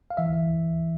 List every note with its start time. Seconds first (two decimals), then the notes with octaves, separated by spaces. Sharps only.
0.10 F5
0.17 E3 E5
0.32 E3